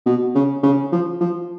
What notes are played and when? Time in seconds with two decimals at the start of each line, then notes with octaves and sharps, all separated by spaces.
0.06 B2
0.35 C#3
0.63 C#3
0.92 F3
1.21 F3